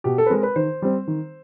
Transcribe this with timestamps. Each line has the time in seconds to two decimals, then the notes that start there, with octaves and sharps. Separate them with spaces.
0.04 B2 G4
0.18 A4
0.26 B4
0.30 G#3 C4 A#4
0.43 B4
0.56 D#3 C5
0.82 G3 C4
1.08 D#3